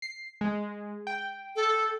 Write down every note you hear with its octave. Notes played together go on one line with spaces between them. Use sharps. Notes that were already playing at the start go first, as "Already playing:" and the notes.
C7
G#3
G5
A4